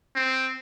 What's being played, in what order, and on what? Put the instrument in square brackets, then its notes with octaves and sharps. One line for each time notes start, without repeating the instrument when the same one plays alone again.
[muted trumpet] C4